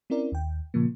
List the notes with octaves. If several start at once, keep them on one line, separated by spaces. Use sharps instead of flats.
C4 C#4 E4 A#4 D5
D#2 G5
A#2 C#3 F3 A#3